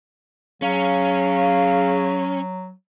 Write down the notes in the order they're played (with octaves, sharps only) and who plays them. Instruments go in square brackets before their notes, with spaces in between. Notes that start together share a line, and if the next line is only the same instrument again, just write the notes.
[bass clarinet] F#3 [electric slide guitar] C#4 [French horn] G#4 [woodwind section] F5